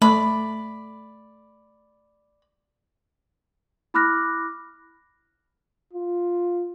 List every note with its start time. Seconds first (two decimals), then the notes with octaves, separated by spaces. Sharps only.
0.02 A3 D5 B5
3.94 E4 B5 D6 F6 F#6 A#6
5.93 F4